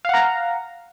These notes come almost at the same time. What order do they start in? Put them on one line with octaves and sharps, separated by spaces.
F5 F#5 A#5